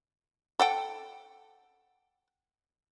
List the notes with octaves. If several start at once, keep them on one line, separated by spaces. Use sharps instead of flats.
A4 F#5 G5